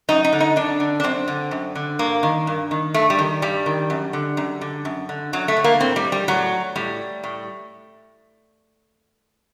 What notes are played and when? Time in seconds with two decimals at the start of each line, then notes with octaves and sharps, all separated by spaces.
0.09 F#2 D#4
0.24 D#4
0.33 D3
0.40 D#4
0.56 F#2 D4
0.80 D3
1.00 D4
1.04 F#2 C4
1.28 D3
1.51 F#2
1.75 D3
1.99 G2 A#3
2.23 D#3
2.47 G2
2.71 D#3
2.94 G2 A3
3.10 G3
3.19 D#3
3.42 G2 G3
3.66 D#3
3.90 F#2
4.13 D3
4.37 F#2
4.61 D3
4.85 F#2
5.09 D3
5.33 F#2 F#3
5.48 A3
5.57 D3
5.64 A#3
5.80 A2 C4
5.96 G3
6.12 G3
6.28 A2 F#3
6.76 A2 G3
7.24 A2